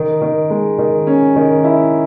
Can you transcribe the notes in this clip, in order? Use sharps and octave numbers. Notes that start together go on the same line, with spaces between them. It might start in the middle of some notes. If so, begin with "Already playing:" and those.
Already playing: D#3
D#3
G#3
D#3
C#4
D#3
E4